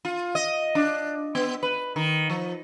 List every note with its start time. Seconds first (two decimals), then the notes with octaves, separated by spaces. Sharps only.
0.05 F4
0.35 D#5
0.75 D4
1.35 B3
1.63 B4
1.96 D#3
2.30 F3